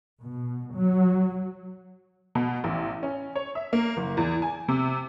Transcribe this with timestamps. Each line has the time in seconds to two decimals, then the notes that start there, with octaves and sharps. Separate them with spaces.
0.21 B2
0.75 F#3
2.35 B2
2.64 A1
3.03 C#4
3.35 C#5
3.55 E5
3.73 A#3
3.97 F#1
4.17 E2
4.42 G#5
4.68 C3